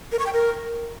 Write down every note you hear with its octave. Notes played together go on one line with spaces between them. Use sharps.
A#4
C#6
G5
A#4